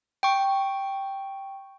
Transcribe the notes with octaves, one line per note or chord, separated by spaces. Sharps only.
G5 C#6